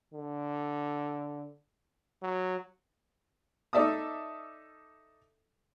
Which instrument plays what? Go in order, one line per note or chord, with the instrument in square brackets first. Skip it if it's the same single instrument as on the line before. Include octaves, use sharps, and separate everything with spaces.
[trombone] D3
F#3
[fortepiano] D#4 A4 D5 E5 A5 D#6